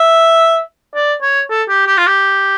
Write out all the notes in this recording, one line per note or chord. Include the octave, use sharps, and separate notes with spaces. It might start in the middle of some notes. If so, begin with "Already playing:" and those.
Already playing: E5
D5
C#5
A4
G4
G4
F4
G4